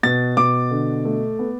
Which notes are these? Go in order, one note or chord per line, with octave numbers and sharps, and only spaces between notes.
B2 A6
B2 D6
D3
A3
B3